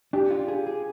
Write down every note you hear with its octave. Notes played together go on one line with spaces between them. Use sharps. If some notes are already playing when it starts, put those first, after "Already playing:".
D4 G4
F4
G#4
G#4